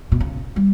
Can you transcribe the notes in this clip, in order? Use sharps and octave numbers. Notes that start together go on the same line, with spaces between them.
B2
C#3
G3